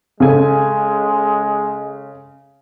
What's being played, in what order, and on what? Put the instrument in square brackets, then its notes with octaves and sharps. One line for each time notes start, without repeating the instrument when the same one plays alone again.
[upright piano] C#3 A4 G#5 [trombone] G#3